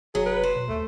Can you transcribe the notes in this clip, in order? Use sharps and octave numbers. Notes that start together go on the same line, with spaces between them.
F1 F#3 G#4
B4
C5
B2
D#2 A3